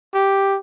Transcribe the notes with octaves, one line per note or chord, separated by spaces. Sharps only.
G4